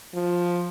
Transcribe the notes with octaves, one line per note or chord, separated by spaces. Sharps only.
F3